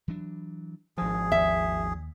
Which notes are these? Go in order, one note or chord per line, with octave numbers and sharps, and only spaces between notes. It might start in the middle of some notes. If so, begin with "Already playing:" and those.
E3 F#3 D4
G#1 D#3 F3 G#4
D#2 E5